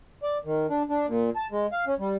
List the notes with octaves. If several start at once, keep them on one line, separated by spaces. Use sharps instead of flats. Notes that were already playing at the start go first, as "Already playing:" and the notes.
D5
D#3
D4
D4
A#2
A5
G#3
F5
C#4
G3